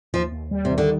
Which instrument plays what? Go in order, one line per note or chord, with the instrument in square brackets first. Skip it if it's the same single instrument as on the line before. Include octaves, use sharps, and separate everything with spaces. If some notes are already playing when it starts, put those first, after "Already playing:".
[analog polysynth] D#2 [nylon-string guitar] F3
[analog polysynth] D#2
G3
[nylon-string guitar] C3
[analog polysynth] D#3
[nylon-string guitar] D3